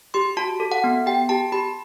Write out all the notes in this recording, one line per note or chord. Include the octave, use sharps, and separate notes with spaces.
G4 C6
F#4 A5
A4
F#5
B3
G4 G5
G4 A5
G4 B5